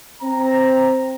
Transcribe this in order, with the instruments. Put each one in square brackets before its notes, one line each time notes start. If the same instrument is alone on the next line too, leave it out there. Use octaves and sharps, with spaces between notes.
[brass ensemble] C4 A#5